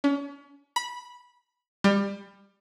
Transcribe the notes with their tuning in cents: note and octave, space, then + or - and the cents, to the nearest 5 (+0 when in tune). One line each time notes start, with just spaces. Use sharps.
C#4 +35
B5 -15
G3 +25